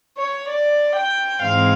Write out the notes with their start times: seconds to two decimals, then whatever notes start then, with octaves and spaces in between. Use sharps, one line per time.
0.17 C#5
0.48 D5
0.95 G5
1.41 G#2 E3 G#3 C4 F5